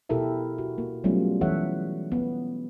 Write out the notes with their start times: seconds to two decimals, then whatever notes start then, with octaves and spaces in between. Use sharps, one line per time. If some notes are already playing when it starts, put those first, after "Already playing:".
0.09 B2 E4 G4 A4 A#4 E5
0.58 F#4
0.78 A#3
1.04 F#3 G3 A3 B3 C#4 F4
1.41 E3 A4 C#5 E5 F#5
2.12 B3